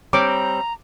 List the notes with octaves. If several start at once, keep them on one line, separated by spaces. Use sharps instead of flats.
G3 C4 C#5 A#5 D6